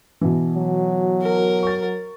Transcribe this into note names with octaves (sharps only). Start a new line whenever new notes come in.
B2 E3
F#3
A#4
C#6 A6